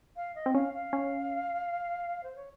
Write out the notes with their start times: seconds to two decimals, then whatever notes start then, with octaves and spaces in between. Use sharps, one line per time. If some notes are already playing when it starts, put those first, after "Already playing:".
0.16 F5
0.35 D#5
0.46 C4
0.54 C#4 F5
0.73 F5
0.93 C#4
2.23 C5
2.35 C#5